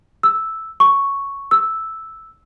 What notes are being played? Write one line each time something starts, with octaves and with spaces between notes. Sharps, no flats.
E6
C#6
E6